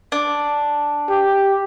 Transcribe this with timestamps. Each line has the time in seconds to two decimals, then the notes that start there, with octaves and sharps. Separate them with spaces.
0.12 D4
1.10 G4